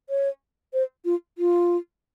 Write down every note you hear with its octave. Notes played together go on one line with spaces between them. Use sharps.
C#5
C5
F4
F4